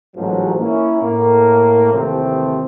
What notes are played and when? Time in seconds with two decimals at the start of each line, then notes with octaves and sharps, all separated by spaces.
0.16 A1 G#2 F3 F#3
0.59 A#3 C#4 E4
1.01 A2 A#3
1.93 D#2 C3 E3 F3 A3 C4